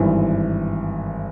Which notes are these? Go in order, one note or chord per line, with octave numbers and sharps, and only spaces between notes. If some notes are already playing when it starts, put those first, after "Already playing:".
Already playing: G#1 G2 E3